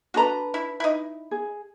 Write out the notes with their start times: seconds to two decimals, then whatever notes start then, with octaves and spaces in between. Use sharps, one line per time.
0.14 D4 F#4 A4 B4 A#5
0.54 E4
0.80 D#4 E4
1.31 G#4